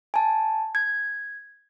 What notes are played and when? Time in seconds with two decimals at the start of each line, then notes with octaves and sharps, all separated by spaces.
0.14 G#5 A5
0.75 G#6